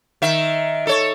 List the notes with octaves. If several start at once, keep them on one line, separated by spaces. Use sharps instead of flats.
D#3 E5
A4 C#5